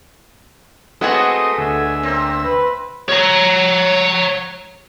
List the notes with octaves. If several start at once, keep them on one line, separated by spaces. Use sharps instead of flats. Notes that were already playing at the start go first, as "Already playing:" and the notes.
G#3 A3 B3 C4 F#4 G#4 A4 D#5
D2 E5 G#5
A#3 C4
B4
C#5 A#5